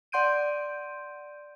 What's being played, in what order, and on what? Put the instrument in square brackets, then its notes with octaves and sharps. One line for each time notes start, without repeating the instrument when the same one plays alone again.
[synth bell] D5 F#5 C6 G6 D7 D#7